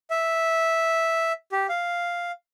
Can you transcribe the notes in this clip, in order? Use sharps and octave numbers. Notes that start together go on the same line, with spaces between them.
E5
G4
F5